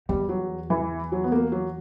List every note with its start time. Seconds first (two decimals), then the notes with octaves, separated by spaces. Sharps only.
0.09 E2 G3
0.29 F#3
0.70 E3
1.12 F#3
1.24 B3
1.32 A#3
1.52 F#3